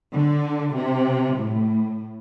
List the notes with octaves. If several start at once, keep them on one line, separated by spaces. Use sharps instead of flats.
D3
C3
A2